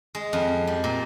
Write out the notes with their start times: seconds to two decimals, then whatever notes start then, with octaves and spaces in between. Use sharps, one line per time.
0.15 G#3
0.33 F2
0.67 G3
0.84 A#2